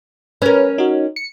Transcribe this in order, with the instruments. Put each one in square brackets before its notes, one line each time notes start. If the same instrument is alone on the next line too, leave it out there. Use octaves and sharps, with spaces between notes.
[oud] C#4 A#4 [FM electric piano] B4
[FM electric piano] D#4 F#4
C#7